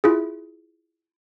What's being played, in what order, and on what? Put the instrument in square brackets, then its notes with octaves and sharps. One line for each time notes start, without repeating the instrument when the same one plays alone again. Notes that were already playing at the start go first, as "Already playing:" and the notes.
[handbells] E4 F4 G#4